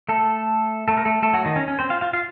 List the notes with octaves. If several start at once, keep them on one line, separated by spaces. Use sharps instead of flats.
A3 A4
A3 A4
A#4
A3 A4
A3 A4
F#3 F#4
D#3 D#4
C#4
C#4
C4 C5
F4 F5
F4 F5
F4 F5